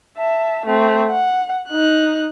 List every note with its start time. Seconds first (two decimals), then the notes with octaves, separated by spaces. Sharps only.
0.18 E5 A5
0.66 A3 C4
1.10 F#5
1.69 D#4 F#6